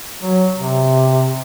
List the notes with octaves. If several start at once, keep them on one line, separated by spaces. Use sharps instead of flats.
F#3
C3